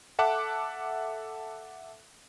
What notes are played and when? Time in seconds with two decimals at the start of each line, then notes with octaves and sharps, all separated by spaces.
0.19 A4 E5 F#5 A5 D6 F#6